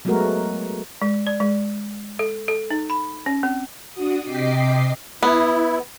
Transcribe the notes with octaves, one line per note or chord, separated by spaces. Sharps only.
F#3 G#3 A3 B3 F#4 A#4
G#3
D5
G#3
A4
A4
D#4
B5
C#4
C4
D4 F#4 D#6
C3 D#5 G5 D6 B6 C7
B3 E4